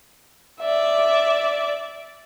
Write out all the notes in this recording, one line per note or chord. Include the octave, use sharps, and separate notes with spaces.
D5 E5